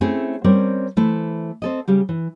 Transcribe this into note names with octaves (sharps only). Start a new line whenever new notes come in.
A3 C4 C#4 E4 G#4
G3 C4 C#4 A#4 C#5 D5
E3 A3 E4 C5
C4 A4 D#5
C#3 G3 G4
E3